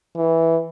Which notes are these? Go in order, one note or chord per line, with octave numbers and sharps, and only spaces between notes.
E3